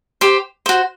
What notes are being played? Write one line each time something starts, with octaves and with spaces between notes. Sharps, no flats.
G4 C5
F#4 C5